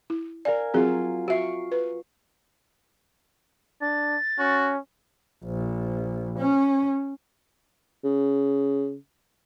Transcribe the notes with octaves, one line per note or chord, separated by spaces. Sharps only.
E4
A#4 D5 F5 G#5
F#3 C4 F4 F#4 G#4
F#4 E5 C#6 C7 D7
B4
D4 A6
C#4 F#4
A#1
C#4
C#3